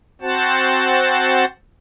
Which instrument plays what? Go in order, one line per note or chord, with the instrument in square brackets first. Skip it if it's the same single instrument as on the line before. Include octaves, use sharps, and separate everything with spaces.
[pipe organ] C4 F#4 C5 F#5 A5